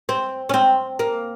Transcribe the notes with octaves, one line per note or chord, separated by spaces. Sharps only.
C4
C#4
C4
A#3